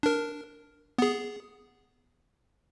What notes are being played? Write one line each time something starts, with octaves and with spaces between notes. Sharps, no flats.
D4 A#4
B3 G#4